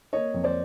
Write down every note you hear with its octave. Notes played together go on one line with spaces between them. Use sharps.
A#3 C#5 D#5
F2
C5 D5